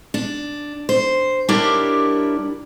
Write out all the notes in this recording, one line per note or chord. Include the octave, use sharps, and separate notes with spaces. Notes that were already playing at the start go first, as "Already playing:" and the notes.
D4
C5
G3 D4 E4 G4 A#4 C#5